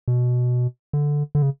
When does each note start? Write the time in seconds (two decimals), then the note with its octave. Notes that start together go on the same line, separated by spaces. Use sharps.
0.08 B2
0.93 D3
1.35 D3
1.42 C#3